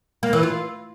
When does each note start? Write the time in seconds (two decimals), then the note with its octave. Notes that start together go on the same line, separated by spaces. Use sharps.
0.23 A#3
0.33 E3
0.43 F4